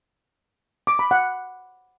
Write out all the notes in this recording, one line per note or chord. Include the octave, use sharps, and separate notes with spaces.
D6
B5
F#5